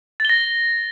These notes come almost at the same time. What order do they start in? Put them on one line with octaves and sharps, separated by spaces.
A6 G7 A#6